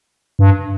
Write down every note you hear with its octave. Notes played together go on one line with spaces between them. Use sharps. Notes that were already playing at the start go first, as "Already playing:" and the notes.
G2